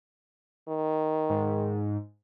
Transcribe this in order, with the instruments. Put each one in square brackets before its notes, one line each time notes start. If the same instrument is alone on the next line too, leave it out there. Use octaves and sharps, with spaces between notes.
[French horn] D#3
[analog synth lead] G#2